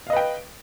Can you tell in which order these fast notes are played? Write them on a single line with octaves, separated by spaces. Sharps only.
F5 D#5 B4 G5